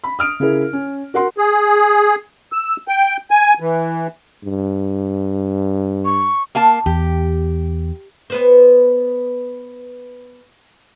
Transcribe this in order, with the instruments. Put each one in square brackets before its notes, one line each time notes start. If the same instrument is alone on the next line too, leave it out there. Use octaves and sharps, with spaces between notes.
[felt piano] B5
D#6 F6 D7
C#3 E4 G#4 A#4
C#4
F#4 A#4 F#5 C6
[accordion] G#4
E6
G5
G#5
E3
[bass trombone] G2
[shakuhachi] C#6
[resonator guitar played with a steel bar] A#3 F5 A5
[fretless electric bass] E2 [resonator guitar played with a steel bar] G4
[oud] B3 B4 C5